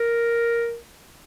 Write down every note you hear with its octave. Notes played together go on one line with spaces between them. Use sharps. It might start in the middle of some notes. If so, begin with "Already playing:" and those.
Already playing: A#4